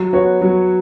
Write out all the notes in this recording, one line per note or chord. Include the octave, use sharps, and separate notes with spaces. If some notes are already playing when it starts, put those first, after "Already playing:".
Already playing: F#3
B3 F#4 C#5
F#3